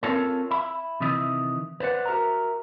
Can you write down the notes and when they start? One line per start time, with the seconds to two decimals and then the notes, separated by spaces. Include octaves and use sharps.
0.03 C4 C#4 F4 A4 A#4 C#5
0.51 E5 B5
1.00 C3 D#3 E3 D#5 E5
1.80 B4 C5 D5 F#5
2.06 F#4 G4 A#4 E5 A#5